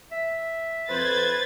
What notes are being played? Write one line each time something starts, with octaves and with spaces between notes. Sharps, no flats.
E5
F2 B4 C5 G#6 A6